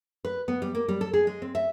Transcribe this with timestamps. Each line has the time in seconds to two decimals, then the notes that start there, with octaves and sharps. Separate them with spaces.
0.25 B4
0.48 B3
0.62 G3
0.75 A#3
0.88 G3
1.01 A4
1.14 G#4
1.27 G#3
1.42 C4
1.55 E5